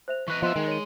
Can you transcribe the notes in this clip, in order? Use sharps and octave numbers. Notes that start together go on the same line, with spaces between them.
C5 E5 F7
E3 B4 D#5 C#6 F#6
F3 B3 D#5 E5 C6 F#6
D#3 G#3
C#5 D#7